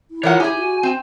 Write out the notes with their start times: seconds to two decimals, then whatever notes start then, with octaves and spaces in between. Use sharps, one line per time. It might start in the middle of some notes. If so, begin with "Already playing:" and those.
0.11 E4
0.23 E3 F4 A#4 C#5 F#5
0.40 G4 G#4 G#5
0.58 F#4
0.83 C4